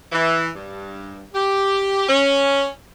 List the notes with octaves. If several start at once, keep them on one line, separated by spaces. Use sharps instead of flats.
E3
G2
G4
C#4